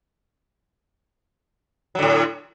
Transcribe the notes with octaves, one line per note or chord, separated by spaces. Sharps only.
A2 D3 F#3